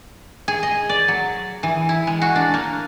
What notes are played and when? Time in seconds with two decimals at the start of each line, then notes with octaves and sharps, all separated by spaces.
0.48 G#4
0.63 D#5
0.89 D5
1.08 F#3
1.63 E3
1.89 E4
2.07 G#3
2.22 F#4
2.36 D4
2.54 A#3